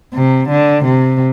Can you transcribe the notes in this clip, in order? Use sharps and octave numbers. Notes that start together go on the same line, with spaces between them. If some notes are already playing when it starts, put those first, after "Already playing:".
C3
D3
C3